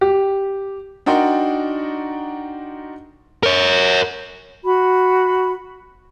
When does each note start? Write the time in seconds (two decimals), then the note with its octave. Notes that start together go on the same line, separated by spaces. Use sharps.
0.01 G4
1.06 D4 D#4 F#4 A#4 G5 C6
3.43 A#4 C#5
4.64 F#4 B5